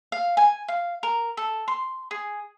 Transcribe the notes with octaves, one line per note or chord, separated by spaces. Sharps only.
F5
G#5
F5
A#4
A4
C6
G#4